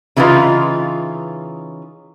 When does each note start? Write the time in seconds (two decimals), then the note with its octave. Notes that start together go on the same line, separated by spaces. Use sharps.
0.17 C#3 E3 G#3 D#4 F4 B4